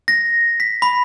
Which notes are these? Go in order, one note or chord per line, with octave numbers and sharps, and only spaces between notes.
A#6
B6
B5